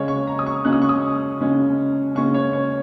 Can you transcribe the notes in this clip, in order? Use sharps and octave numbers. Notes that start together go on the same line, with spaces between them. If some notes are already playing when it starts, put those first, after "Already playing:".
Already playing: C#3 G#3 C#4 C#5
C#6
A#5
D#6
C#6
C#3 G#3 C#4 F#6
D#6
C#6
D#6
C#3 G#3 C#4
C#3 G#3 C#4 C#6
C#5
C#5